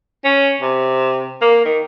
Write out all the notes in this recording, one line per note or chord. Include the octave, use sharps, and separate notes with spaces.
C#4
C3
A#3
D#3